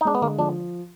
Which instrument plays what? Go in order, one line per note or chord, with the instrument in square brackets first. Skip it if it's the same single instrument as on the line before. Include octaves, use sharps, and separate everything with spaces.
[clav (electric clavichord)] D#4
[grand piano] G#3 [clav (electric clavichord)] D4
[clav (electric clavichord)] B3
[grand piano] D3 [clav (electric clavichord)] A#3
[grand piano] F3 [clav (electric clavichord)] D4